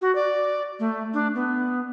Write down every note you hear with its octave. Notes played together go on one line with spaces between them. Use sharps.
F#4
D5
A3
D4
B3